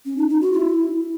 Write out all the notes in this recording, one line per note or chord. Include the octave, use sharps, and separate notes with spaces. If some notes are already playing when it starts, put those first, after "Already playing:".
C#4
D#4
D#4
F#4
E4